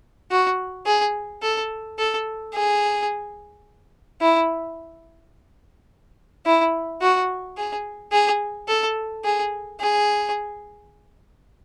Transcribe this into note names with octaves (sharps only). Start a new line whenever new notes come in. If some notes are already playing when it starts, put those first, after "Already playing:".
F#4
G#4
A4
A4
G#4
E4
E4
F#4
G#4
G#4
A4
G#4
G#4